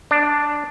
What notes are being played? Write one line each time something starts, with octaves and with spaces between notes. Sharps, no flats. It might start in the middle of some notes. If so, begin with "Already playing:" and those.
D4